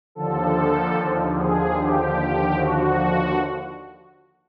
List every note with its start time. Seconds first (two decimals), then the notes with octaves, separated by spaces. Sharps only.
0.15 D#2 D3 F3 A4
1.35 G#4
1.75 G4
2.54 F#4